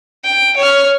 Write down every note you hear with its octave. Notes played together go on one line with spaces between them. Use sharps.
G5
C#5 F6